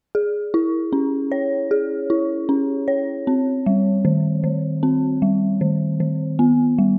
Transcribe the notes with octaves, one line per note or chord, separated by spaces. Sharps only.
G#4
E4
C#4
C#5
G#4
E4
C#4
C#5
C4
G3
D#3
D#3
C4
G3
D#3
D#3
B3
G3